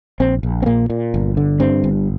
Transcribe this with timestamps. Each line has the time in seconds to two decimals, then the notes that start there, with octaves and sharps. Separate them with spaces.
0.20 A#1 C4
0.43 A#1
0.62 C4
0.66 A#2 A#3
0.90 A#2
1.14 G1
1.37 D3
1.60 G2 C4
1.84 G1